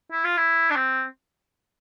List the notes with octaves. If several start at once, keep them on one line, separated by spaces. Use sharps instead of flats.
E4
F4
E4
D4
C4